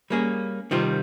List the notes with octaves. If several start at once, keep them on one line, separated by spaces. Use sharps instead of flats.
G3 A#3 C#4 G#4
C3 D#3 G3 C4 F4